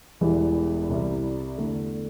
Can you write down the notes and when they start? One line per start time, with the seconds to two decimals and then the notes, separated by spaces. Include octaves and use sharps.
0.21 E1 E2 E3 G3 E4
0.89 C2 C3 G3 E4
1.58 E2 D3 A3